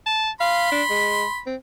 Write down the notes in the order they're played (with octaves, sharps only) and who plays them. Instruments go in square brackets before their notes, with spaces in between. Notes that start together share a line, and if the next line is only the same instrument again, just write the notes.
[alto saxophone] A5
[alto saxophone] F5 [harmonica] B5 C6
[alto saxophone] D4
G#3
C4